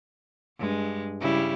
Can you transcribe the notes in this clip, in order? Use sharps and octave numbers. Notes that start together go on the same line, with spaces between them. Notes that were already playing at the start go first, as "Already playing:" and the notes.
G2 G#3
C#3 G3 E4